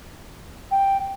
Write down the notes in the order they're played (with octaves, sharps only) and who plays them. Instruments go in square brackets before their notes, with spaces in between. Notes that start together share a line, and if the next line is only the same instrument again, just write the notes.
[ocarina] G5